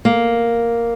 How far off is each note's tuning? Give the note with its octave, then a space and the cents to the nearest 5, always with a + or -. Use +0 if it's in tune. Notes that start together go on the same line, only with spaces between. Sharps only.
A#3 +0